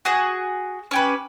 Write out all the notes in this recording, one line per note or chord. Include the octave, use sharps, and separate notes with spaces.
F#4 G#4 F#5
C#4 G4 B4